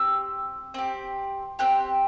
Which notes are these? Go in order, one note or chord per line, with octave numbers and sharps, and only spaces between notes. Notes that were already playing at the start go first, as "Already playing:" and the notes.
Already playing: C4 G4 E6
C4 G4
C4 G4 F#6